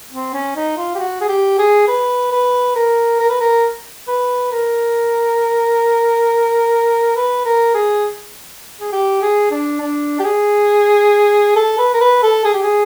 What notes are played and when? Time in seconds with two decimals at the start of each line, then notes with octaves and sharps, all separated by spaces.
0.11 C4
0.34 C#4
0.56 D#4
0.77 F4
0.95 G4
0.99 F#4
1.21 G#4
1.29 G4
1.59 G#4
1.88 B4
2.31 B4
2.76 A#4
3.20 A#4
3.30 B4
3.40 A#4
4.08 B4
4.52 A#4
7.16 B4
7.45 A#4
7.75 G#4
8.80 G#4
8.92 G4
9.22 G#4
9.51 D4
9.81 D4
10.20 G4
10.24 G#4
11.56 A4
11.78 B4
11.94 A#4
12.01 B4
12.23 A4
12.44 G#4
12.54 G4
12.63 G#4